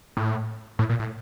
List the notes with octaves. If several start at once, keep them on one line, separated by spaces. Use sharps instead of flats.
A2
A2
A#2
A2